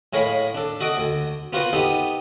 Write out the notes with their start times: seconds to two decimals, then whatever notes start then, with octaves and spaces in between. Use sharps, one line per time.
0.13 A2 G#3 A#4 C#5 F5 B5
0.55 D4 A4
0.81 F#4 A4 D#5 D6
0.97 D2
1.53 B3 F4 F#4 A#4 C5
1.73 B3 D#4 G4 A4